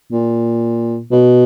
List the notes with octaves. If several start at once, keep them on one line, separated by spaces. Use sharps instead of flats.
A#2
B2